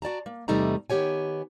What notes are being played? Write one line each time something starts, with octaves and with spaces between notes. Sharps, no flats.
F#4 D5 A5 A#5
A#3
E2 C3 G3 A3 D#4 A#5
D#3 B3 G4 C#5 G#5